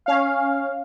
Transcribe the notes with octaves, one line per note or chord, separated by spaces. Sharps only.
C#4 F5